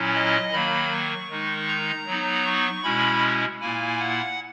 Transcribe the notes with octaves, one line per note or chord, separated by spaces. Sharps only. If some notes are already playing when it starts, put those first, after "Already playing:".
Already playing: A#2 F#3 C#4 E4
D#5
D#3 F#3 A#3 B5
C#6
D#3 G#3 D#4
A#5
F#3 B3 D#4
C#6
B2 G#3 C#4 E4 B5
A#2 A#3 E4 G#5
F#5